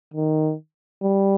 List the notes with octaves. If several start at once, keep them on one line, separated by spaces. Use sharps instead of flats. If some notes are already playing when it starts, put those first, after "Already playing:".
D#3
G3